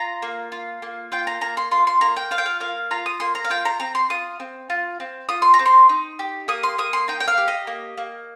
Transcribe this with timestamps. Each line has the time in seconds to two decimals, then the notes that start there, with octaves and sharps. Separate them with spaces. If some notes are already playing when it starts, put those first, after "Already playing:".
Already playing: F4 A#5
0.22 A#3
0.52 F4
0.82 A#3
1.12 F4 G5
1.27 A#5
1.41 A#3 A#5
1.57 C6
1.71 F4 C6
1.87 C6
2.01 A#3 A#5
2.16 G5
2.31 F4 F5
2.38 G5
2.46 F5
2.60 A#3 F5
2.91 F4 A#5
3.06 D#6
3.20 A#3 C6
3.35 A#5
3.44 F5
3.50 F4 G5
3.65 A#5
3.80 C4 A#5
3.95 C6
4.10 F4 D#6
4.40 C4
4.70 F4
5.00 C4
5.29 F4 D#6
5.42 C6
5.54 A#5
5.59 C4
5.66 C6
5.89 D#4
6.19 G4
6.48 A#3 D#6
6.63 C6
6.78 A#3 D#6
6.93 C6
7.08 D#4 G5
7.20 G5
7.28 F5
7.38 G4
7.48 D#5
7.67 A#3
7.97 A#3